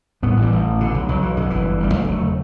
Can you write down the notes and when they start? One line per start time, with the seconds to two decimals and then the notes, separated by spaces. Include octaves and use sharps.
0.23 A2 G3 B3
0.37 A1
0.42 E3 G3
0.52 A1
0.66 A2
0.79 B2 D3
0.94 B1
1.08 B1 F#3
1.22 B2 E3
1.37 F#2 D3
1.50 G1 E3
1.66 D3
1.80 G1 G3
1.94 D2 D3 F#3
2.08 E1 F#3 A3
2.22 D3